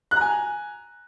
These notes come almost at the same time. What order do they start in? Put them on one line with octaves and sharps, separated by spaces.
F#6 A#5 G#5